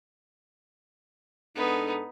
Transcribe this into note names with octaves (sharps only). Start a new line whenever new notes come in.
G#2 B3 D4 D#4 A4